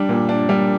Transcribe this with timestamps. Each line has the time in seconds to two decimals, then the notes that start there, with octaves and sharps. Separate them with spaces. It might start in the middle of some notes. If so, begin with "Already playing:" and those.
Already playing: G3 D4
0.09 A#2
0.29 D4
0.49 G3